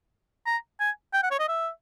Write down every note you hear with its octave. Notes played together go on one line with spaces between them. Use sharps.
A#5
G#5
G5
F#5
C#5
D#5
E5